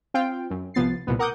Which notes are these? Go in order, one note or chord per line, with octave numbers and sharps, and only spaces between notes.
C4 F4 F5 G5
F#2
C2 F3 B3 A6 C7
C2 A#2 B3
A#4 F#5 D6 D#6 G6